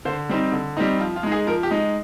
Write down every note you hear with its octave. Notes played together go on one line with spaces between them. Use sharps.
D3 C5
G3 C4 D#4
D3
G3 C4 D#4
F3 F4
F4
G#3 D#4
G#4
F3 A#4
G4
G#3 D#4